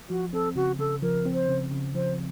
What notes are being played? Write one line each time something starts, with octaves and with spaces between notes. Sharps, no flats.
F3 F#4
C4 A4
C#3 F#4
C#3 A4
F3 A#4
C4
C5
C#3
C#3
F3 C5